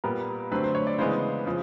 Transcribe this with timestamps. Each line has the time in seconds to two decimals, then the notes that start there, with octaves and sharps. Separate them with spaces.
0.04 A#2 G3 B3 A#4
0.51 D3 F#3 A3 C4 B4
0.64 C5
0.75 C#5
0.87 D5
0.98 C#3 E3 G#3 B3 C5
1.46 C#3 F3